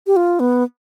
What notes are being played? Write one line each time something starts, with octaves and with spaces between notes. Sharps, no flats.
G4
F4
B3